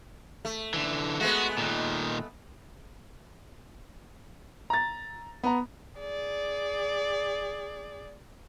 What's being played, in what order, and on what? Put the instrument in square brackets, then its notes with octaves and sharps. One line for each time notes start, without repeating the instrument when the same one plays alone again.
[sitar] A3
[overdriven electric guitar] D3 E3
[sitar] G#3 A3 B3 [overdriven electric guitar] F#4
[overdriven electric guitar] A#2 D#3
[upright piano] A#5 A6
B3 A#5
[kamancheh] G#4 D5